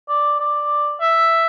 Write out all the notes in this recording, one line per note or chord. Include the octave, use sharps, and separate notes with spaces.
D5
D5
E5